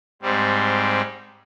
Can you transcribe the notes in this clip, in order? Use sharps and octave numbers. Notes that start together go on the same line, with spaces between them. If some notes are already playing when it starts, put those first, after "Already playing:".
G#2 G3 C4